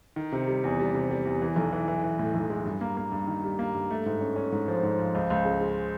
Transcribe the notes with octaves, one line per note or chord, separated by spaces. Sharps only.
D#3
C3
G3
E2
G3
C3
G3
E2
E3
B1
E3
E3
E3
A2
B1
G#3
G2
A#3
A#3
G2
D#3
G3
A#3
G2
A3
G#2
C#4
C#4
G#2
F3
G#2
F3
C#2
C#2
C#3
G#3